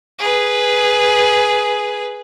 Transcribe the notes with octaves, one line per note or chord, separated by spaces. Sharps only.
G#4 B4